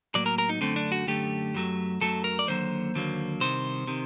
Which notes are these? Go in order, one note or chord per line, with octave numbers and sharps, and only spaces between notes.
A2 F#3 A#3 D5
A#4
A#4
D#4
F#2 D3 A3 C4
D4
F#4
F#2 D3 A3 G4
F#2 F#3 A3
F#2 F#3 A3 A4
A#4
D5
D#2 D3 F#3 A#3 C5
D#2 D3 F#3 A#3
C2 C3 D#3 C5
C3 D#3